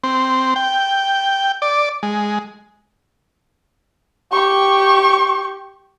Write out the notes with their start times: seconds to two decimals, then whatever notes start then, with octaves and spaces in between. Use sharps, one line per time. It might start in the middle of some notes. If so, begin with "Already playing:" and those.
0.04 C4
0.56 G5
1.62 D5
2.03 G#3
4.32 G4 C#6